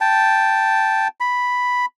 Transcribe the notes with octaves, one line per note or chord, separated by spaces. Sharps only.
G5 A5
B5